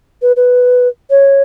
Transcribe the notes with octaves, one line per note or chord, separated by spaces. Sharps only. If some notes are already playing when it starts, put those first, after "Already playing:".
B4
B4
C#5